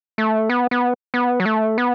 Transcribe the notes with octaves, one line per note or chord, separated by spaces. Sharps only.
A3
B3
B3
B3
F#3
A3
B3